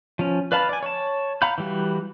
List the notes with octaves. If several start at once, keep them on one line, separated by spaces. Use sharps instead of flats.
F3 C#4
B4 D5 F5 A5 B5
D5 G#5
C#5 A5
F5 F#5 A#5 B5 G6
E3 G3 F#4